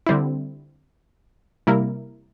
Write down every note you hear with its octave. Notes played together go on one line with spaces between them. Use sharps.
D3 G3 C4 E4
C3 G3 A#3 E4 A#4